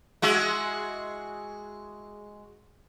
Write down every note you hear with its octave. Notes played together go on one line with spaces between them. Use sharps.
G#3 F#4 E5